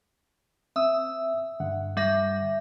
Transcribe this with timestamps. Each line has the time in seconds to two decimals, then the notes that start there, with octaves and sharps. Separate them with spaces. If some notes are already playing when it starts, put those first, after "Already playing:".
0.76 C4 E5 D#6 E6
1.60 G2 D3 F#5
1.97 G3 E5 A#6